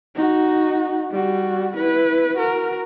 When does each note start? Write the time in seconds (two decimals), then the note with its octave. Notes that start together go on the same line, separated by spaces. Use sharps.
0.15 D#4 F#4
1.11 G3 F#4
1.77 E4 B4
2.37 F#4 A#4